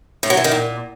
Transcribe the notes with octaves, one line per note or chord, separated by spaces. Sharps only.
A2
F#3
E3
D#3
A#2